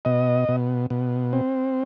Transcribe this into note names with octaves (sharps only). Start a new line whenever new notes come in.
B2 D#5
B2
B2
C4